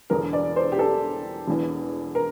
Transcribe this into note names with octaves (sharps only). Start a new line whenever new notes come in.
E1 E2 D3 A#4
D5
C5
G4
A4
E1 E2 E3
A#4